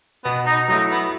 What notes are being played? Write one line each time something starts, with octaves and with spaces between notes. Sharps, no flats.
B2 B3
D#4
F#3 A3 D#4 E4
B3